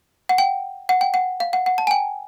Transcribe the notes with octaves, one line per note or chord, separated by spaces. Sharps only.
F#5
G5
F#5
G5
F#5
F5
F#5
F#5
A5
G#5
G5